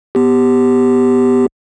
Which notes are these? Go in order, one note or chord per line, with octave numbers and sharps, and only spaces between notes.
B3 G4